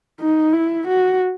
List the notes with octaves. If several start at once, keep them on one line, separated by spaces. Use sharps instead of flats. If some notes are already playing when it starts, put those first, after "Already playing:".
D#4
E4
F#4